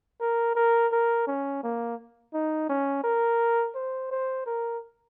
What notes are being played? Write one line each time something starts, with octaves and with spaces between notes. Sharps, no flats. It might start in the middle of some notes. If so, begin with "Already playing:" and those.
A#4
A#4
A#4
C#4
A#3
D#4
C#4
A#4
C5
C5
A#4